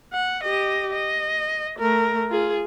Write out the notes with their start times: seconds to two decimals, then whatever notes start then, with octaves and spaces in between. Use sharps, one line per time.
0.13 F#5
0.44 G4 D#5
0.92 D#5
1.78 A3 A#4
2.30 F4 G#4